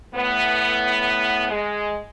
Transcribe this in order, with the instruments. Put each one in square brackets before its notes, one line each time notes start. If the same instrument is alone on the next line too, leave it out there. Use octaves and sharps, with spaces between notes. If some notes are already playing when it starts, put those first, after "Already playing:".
[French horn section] A2 B3
G#3